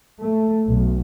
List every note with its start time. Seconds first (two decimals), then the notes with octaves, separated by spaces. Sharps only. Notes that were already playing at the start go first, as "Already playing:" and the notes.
0.20 A3
0.65 B1